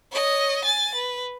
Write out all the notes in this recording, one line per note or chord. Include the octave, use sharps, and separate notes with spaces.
C#5 D#5
G#5 A6
B4